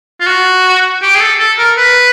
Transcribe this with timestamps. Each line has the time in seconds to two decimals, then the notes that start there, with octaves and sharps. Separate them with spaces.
0.20 F4
0.26 F#4
1.02 G4
1.16 G#4
1.20 A4
1.40 A4
1.58 A#4
1.77 B4